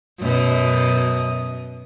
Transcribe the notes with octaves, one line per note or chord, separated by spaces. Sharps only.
F#2 B2 D#5